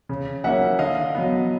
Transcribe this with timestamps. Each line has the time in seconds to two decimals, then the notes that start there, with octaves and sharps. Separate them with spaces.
0.09 C#3
0.44 F#3 A#3 C#4 E5 F#5
0.79 D3 D#5 F5
1.15 F#3 B3